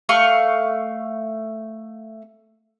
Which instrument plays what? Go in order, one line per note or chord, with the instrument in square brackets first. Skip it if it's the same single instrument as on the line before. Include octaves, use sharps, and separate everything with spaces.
[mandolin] A3 F5 C#6